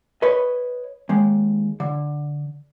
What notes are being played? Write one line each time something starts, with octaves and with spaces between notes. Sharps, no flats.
B4 C#5 D#5
D#2 G#3
D3